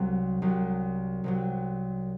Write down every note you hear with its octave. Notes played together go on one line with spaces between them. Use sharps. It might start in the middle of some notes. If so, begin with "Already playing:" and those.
Already playing: C2 C3 F#3
C2 C3 F#3
C2 C3 F#3